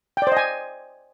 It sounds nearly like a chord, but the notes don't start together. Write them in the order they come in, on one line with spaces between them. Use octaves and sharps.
G5 D5 C5 D#5 G#5